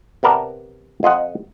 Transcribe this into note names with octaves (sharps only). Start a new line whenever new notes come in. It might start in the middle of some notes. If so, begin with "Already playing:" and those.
C3 B3 A#4 D5 A5
F2 F4 D#5 F#5